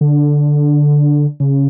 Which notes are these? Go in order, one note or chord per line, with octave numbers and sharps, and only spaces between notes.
D3
C#3